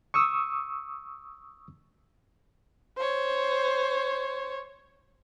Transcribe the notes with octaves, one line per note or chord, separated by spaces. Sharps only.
C#6 D#6 E6
C5 C#5